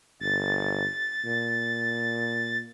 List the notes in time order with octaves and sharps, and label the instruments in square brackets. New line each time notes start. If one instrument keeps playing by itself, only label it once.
[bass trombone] G1 [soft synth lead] A6
[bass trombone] A#2